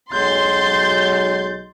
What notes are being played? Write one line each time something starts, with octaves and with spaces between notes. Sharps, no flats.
B1 F#3 G#3 C6 G6 A6